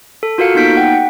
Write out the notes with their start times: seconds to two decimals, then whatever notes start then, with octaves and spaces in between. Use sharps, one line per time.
0.23 A4
0.38 F4 F#4 A4 A#4 F5 C#7
0.55 A#3 B3 D#4 G6 B6 D7
0.77 F#5 G5